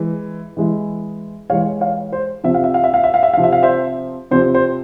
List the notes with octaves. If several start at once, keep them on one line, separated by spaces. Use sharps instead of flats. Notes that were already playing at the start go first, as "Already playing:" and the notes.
Already playing: E3 G#3 E4
E3 G#3 E4
E3 G#3 E4 C#5 F5
C#5 F5
C5
C3 F3 C4 E5
F5
E5
F5
E5
F5
E5
F5
E5
C3 F3 C4 F5
E5
F5
C5 E5
C3 F3 C4 C5
C5